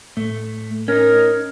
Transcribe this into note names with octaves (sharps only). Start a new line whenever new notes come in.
A2 A3
C#4 D#4 A#4